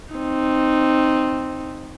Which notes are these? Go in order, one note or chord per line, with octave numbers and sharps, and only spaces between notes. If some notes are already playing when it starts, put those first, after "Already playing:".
C4 D#4